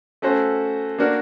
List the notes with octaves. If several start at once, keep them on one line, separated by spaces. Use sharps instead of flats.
A3 C#4 F#4 A4 C5
A#3 D4 F#4 A#4